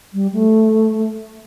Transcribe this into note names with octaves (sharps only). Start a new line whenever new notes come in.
G3
A3